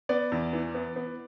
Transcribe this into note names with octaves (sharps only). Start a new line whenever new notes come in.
B3 D5
E2
E3
B3
B3